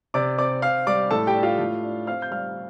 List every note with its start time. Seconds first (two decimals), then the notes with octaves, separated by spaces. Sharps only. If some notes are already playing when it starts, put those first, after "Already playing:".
0.14 C3 D5 D6
0.38 C4 D5 D6
0.62 C4 F5 F6
0.87 G3 D5 D6
1.11 A2 A4 A5
1.27 G4 G5
1.35 D4
1.43 F4 F5
1.59 A2
1.83 D4
2.07 C4 F5 F6
2.22 G6
2.31 G3 F5 F6